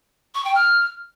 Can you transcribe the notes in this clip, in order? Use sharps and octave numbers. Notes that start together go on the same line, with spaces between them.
C#6
G5
F6